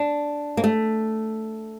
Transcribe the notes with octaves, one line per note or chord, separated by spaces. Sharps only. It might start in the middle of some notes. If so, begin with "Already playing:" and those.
Already playing: D4
A#3
A3